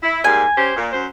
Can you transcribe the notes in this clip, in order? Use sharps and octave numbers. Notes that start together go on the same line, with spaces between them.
E4
G#2 G3 A#3 G#5
C#4 G4 C5
A#2
F#2 C5